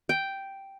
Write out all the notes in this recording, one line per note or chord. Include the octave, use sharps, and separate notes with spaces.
G5